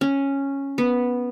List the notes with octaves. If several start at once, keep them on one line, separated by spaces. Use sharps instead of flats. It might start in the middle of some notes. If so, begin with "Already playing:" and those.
C#4
B3